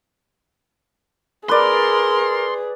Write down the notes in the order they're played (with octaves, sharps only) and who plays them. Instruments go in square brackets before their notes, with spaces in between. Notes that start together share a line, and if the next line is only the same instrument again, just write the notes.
[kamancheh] G#4 [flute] A#4 [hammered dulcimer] B4 D5 [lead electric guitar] C6